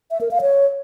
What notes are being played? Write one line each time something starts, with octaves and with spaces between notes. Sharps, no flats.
E5
A#4
F5
C#5